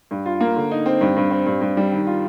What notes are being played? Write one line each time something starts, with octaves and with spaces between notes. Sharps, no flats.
G2
F4
A#3
D3
D#4
C4
G2
G2
C4
G2
G2
G3
D#3
F4